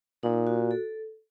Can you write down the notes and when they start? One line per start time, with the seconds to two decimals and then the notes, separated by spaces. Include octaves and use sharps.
0.23 A#2 D#4
0.47 F#4
0.71 A4